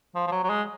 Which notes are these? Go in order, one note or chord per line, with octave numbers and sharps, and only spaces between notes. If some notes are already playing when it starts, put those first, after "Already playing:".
F3
F3
F#3
F#3
G#3